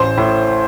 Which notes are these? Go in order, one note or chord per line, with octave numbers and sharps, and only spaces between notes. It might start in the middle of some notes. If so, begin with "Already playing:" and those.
Already playing: A1 C5
A2